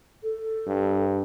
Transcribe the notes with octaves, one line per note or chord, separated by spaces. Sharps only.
A4
G2